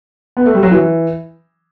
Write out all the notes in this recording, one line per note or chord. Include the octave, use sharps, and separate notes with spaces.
B3
A3
G3
F#3
E3